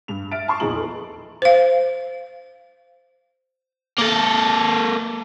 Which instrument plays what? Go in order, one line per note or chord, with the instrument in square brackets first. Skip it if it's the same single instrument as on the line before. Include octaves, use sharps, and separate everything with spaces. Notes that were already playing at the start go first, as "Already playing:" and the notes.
[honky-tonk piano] G2 F7
E5 F6 A6 D7
A5 C6 C#6
A#1 E2 D#4 G#4 A#5 F#7
D#4 A4 B4
[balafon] C5 F5
[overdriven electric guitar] A#3 A4